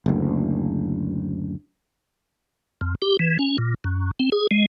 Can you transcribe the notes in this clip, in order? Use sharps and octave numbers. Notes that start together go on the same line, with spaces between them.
F#1 D2
F2
G4
E3
C#4
A#2
F#2
C4
G#4
G#3